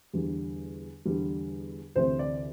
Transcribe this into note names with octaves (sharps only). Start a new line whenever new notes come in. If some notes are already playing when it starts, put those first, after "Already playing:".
E2 D3 G3
E2 D3 G3
D2 C3 E3 C5
D5